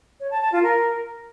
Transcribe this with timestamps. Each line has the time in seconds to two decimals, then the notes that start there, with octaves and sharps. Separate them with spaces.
0.20 C#5
0.31 A5
0.41 A5
0.52 F4
0.63 A#4